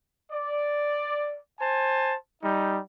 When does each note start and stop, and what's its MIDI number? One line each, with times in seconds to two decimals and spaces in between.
0.32 1.38 74
1.60 2.15 72
1.60 2.15 80
1.60 2.15 81
2.43 2.80 55
2.43 2.80 63